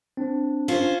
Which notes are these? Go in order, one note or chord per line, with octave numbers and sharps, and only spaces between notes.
C4 D4
C#4 F4 C5